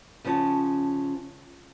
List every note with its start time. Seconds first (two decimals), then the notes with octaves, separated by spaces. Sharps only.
0.25 C#3 F3 C#4 F#4 A5